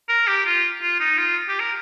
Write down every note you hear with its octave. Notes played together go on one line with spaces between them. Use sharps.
A#4
G4
F4
F4
D#4
F4
G4
A#4